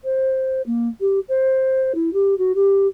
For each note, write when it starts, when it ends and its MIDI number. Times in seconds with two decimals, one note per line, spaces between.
0.04 0.61 72
0.66 0.88 58
1.00 1.19 67
1.28 1.92 72
1.94 2.12 64
2.13 2.34 67
2.38 2.52 66
2.55 2.86 67